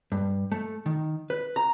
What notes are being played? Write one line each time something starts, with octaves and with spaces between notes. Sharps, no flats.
G2
A3
D#3
B4
A#5